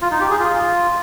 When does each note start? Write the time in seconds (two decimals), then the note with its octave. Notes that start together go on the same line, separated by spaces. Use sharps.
0.02 F4
0.11 D#4
0.21 G4
0.30 G#4
0.39 F4